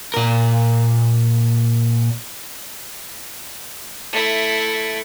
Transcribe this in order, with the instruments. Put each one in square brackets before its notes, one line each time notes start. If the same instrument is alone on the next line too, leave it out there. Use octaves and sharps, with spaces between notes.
[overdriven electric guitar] A#2 A#4
[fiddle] A3 E4